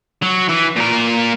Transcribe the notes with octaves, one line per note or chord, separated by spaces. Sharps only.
F#3
E3
A#2 A#4